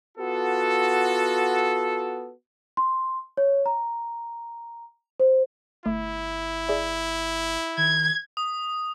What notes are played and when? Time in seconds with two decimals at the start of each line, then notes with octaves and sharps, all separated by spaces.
0.17 B3 F4 F#4 A4
2.77 C6
3.37 C#5
3.66 A#5
5.20 C5
5.86 G1 A3 E4
6.69 G#4 D5 E5
7.77 D#3 G#6
8.37 D#6